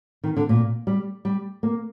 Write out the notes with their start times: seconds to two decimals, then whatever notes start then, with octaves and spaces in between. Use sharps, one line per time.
0.24 D#3
0.37 D3
0.49 A#2
0.87 G3
1.25 G3
1.63 A#3